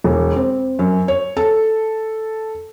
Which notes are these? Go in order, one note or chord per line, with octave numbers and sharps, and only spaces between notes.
E1
C4
F#2
C#5
A4